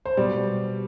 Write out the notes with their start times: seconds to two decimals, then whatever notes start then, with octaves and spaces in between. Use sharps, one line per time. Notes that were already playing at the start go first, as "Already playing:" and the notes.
0.05 C5
0.17 B2 G3 D5